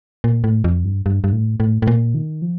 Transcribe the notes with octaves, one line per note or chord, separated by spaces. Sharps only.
A#2
A2
F2
G2
G2
G2
A2
A2
A2
A#2
D#3
F3